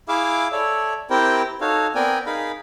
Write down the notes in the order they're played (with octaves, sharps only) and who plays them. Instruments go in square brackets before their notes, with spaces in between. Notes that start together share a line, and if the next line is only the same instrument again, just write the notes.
[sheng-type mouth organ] E4 G#4 E5 F5 D6
A4 C#5 D5 E5
C4 E4 G4 A#4 C5 G5
D#4 F#4 A4 C#5 F5
B3 C4 A#4 D5 G5 G#5
D#4 G#4 A#4 F5 B5